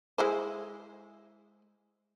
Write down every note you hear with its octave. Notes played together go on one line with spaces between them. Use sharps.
G#3 E4 C5